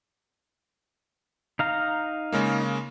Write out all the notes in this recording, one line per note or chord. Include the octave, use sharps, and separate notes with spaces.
D#4 F5 A#5
C#3 G#3 A#3